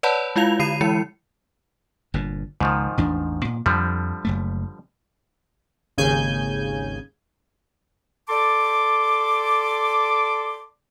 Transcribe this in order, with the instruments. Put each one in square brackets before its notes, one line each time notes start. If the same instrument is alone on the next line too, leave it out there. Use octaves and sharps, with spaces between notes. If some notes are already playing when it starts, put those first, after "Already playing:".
[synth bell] B4 C#5 D5 F#5 A5 B5
G#3 E4 F4 F5 F7
D3 B5 C7 D#7
E3 G#3 E4 C#7
[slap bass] G1 G2 A#2
[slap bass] C#2 [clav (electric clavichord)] G#2 D#3 F3
[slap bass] A1 E2 D4
A#2
[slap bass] F2 [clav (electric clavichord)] D3 F3 G3
[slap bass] F#1 F#2 A3
[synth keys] G#1 D#2 C#3 G#5 G6
[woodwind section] A4 D5 A5 C6 D6